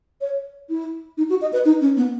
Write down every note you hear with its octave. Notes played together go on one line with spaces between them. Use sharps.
C#5
E4
D#4
F#4
D#5
B4
D#4
C#4
B3